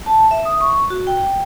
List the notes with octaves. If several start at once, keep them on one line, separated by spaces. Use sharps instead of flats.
A5
E5
D#6
C#6
F#4
G5